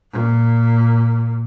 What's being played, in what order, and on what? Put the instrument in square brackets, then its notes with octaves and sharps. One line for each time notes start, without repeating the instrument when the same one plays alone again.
[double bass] A#2